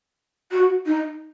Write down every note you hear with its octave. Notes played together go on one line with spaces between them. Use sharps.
F#4
D#4